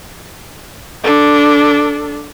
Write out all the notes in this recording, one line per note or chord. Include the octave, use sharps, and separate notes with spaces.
D4 A4